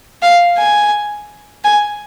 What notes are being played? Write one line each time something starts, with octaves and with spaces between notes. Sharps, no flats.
F5
G#5
G#5